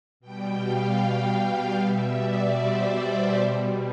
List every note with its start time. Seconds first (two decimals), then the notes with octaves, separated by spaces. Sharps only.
0.20 B2 G3 G5
0.60 F5
1.78 B2 G3 E5
2.18 D5
2.57 C5
3.37 B2 G3